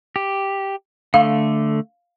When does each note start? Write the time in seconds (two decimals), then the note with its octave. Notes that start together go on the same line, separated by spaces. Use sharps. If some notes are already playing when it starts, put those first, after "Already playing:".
0.16 G4
1.14 D3 A3 F5